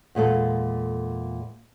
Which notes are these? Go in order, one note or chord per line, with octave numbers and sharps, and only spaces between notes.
E2 A#2 G#3 A4